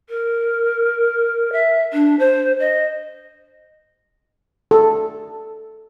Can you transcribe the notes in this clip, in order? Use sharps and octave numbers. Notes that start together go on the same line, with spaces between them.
A#4
E5
D4
C5
D#5
A4